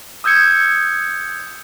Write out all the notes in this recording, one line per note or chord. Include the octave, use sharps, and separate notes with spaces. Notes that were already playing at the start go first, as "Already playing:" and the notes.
D#6 E6 G6 G#6 C#7